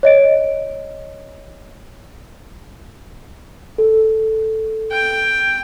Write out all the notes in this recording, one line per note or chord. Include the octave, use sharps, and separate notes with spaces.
C#5 D#5 D7
A4
G5